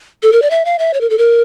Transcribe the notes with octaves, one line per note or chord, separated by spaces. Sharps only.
A4
A#4
D5
E5
F5
E5
C#5
A#4
A4
A#4